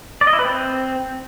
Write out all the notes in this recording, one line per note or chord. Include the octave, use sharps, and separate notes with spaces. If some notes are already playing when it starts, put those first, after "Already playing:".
D5
D#5
E4
B4
C4